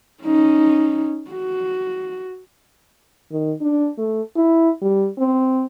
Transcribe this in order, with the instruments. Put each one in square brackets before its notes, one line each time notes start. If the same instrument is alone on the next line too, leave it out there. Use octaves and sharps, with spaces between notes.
[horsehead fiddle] C#4 D#4
F#4
[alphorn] D#3
D4
A3
E4
G3
C4